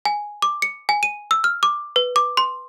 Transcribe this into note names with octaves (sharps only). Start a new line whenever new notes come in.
G#5
D6
C#7
G#5
D#7
E6
F6
D6
B4
D6
C6